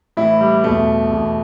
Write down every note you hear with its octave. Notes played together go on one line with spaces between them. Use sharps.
A2 E3 E4
G3
E2 B2 A3
E2 B2